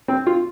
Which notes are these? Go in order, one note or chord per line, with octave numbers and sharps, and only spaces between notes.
C4
F4